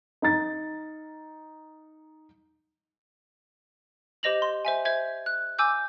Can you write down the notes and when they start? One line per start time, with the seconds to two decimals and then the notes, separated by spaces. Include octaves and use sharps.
0.22 D#4 A#5 A6
4.23 G4 C5 D#5 A#6 F7 F#7
4.42 C6
4.65 C5 E5 G#5
4.85 C5 E5 G#6
5.26 F#6
5.59 G#5 D6 E6 G6